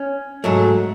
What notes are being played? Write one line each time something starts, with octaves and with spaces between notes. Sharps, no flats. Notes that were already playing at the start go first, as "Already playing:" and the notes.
Already playing: C#4
G#2 F#3 A3